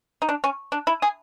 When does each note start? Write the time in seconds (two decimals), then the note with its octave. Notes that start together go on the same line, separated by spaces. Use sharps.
0.22 D#4
0.29 D4
0.44 C#4
0.72 D4
0.87 E4
1.02 G#4